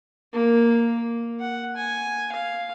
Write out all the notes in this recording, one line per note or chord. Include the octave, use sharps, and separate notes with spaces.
A#3
F#5
G#5
F5